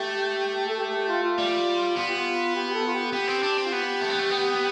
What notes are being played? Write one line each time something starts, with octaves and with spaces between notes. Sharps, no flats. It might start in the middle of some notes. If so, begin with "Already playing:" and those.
Already playing: A3 G4
A4
G4
G4
F4
F4
G3
B3 F4
G4
F4
G4
G4
A4
F4
G4
B3 G4
C4
D4
C4
F4
B3 G4
A3
B3
A3
B3